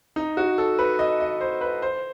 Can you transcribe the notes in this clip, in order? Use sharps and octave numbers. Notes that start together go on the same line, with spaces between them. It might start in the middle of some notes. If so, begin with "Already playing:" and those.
D#4
F#4
A4
B4
D#5
D#5
C5
B4
C5